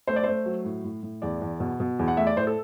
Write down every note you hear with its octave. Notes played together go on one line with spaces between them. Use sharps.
A3 C5
D5
A3 C5
F#3
A2
A2
A2
E2 D5
E2
B2
B2
E2
F#5
A3 E5
D5
A2 C5
A4